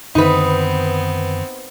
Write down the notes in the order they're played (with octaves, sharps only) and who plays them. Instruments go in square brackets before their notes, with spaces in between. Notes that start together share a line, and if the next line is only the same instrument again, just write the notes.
[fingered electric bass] F#2 D3 D#3 [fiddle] B3 C4 [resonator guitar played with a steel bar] D#4 B4